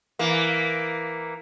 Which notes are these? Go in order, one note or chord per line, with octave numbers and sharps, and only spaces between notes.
E3 A#3